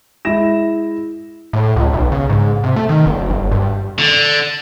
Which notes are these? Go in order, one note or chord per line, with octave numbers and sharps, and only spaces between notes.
G#3 E4 A#6 E7
A2
C#2
B1
C#3
G#2
C3
A3
D#3
F#1
G1
G2
D3